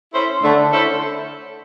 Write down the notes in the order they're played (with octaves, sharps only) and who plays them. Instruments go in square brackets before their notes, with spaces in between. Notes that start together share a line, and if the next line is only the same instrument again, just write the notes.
[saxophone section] C#4 E4 A4 C5
[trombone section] D3 [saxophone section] A3
[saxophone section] C#4 E4 A4 C5